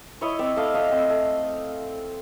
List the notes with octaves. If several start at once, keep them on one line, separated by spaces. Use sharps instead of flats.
E4 C#5 D#5
C4 D5 E5
A3 D#5 F5
A3 D#5 F5
C4
A3